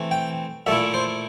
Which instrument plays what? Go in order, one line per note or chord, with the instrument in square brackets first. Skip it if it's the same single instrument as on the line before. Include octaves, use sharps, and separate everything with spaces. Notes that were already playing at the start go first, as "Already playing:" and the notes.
Already playing: [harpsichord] E3 A3 C4
G5
A#2 A3 E4 E5
C5